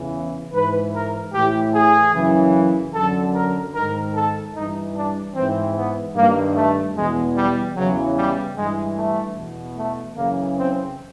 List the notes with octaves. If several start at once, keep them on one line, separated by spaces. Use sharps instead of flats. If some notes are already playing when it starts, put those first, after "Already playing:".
Already playing: E2 C#3 E3
G#2 E3 B4
A#4
A2 E3 G4
G#4
F#2 C#3 E3
F#2 D3 A4
A#4
G#2 D#3 A#4
A4
G2 E3 D#4
D4
G#2 E3 C4
B3
G2 D#3 A#3
A3
E2 B2 G#3
G3
E2 C#3 E3 F#3
G3
G2 E3 G#3
A3
E2 B2
A3
F#2 C#3 E3 A#3
C4